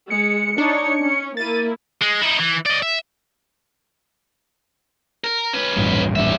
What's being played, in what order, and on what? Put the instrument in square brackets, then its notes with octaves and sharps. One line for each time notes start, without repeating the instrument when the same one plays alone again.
[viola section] G#3 [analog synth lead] C#7
[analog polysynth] D4 [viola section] D#4 C#5
[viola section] C#4
[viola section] A#3 E4 [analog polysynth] A6 D#7
[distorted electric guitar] G#3
D#4 E4
E3
D5 D#5
E5
A#4
C#4 B4
[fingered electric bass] D#1 A1 G2
[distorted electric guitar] G3 E5